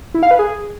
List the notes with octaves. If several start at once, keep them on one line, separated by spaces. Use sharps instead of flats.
E4
F5
B4
G#4